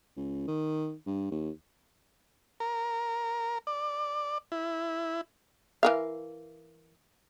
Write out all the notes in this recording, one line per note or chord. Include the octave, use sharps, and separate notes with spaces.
C#2
D#3
G2
D#2
A#4
D5
E4
E3 A#4 F5